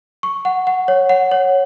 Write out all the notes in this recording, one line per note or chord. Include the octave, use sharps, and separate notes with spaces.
C#6
F#5
F#5
C#5
F#5
C#5